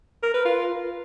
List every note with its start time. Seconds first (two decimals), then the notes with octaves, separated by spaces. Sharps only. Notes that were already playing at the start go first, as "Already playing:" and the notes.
0.23 A#4
0.34 B4
0.45 F4